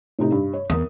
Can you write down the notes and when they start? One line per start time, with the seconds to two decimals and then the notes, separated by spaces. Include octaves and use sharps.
0.19 A2 C3 D#4
0.32 G2
0.53 C#5
0.70 E2 A#4 D#6